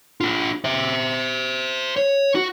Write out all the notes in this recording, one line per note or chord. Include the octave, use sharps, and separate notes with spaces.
D4 F4
C5 E5
C#5
F#4